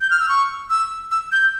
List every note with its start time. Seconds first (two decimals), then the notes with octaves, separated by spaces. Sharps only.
0.01 G6
0.10 F6
0.20 E6
0.29 C#6
0.70 E6
1.11 E6
1.32 G6